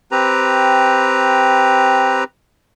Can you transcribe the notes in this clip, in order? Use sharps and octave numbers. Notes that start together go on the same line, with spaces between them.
C4 G4 B4 A#5